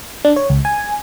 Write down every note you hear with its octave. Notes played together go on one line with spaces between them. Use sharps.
D4
C#5
C#2
G#5